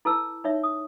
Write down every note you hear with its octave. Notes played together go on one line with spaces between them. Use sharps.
E4 A4 B4 A5 E6
D#4 C#5 E5
D#6